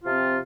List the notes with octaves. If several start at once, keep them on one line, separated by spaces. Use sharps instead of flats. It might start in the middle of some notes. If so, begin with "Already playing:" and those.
C3 F3 C4 F4